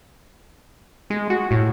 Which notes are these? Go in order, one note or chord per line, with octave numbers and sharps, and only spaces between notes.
G#3
F#4
A2